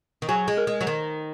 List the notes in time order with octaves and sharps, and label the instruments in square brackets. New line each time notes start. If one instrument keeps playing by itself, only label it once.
[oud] D#3
[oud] F#3 [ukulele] G#4
[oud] G#3
[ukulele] A#4
[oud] G#3
F#3
D#3